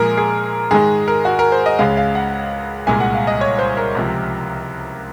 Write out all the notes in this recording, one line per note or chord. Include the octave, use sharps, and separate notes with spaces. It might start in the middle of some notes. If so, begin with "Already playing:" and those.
Already playing: A#2 F3 G#3 G#4 A#4
G#4
G#2 D#3 G#3 G#4
A#4
F#4
A#4
C5
D#5
C#2 C#3 G#3 F5
F5
F#5
C2 A#2 G#3 G#5
F#5
F5
D#5
C#5
C5
A#4
C#2 C3 F3